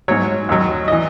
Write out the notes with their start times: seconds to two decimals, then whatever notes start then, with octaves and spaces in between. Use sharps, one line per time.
0.08 G#2 F#3 C#5
0.49 D#2 D#3 F#3
0.88 E3 D#5